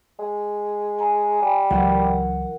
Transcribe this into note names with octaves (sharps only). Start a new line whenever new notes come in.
G#3
G#5 A#5
G3
C#2 E3 F#3 E4 A#4 F#5